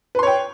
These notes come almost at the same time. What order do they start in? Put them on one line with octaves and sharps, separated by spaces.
B4 C6 C#5 G5